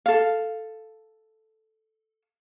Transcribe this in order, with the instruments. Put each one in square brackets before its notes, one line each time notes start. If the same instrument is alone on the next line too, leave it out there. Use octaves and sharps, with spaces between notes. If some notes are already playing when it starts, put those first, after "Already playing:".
[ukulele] A4 F5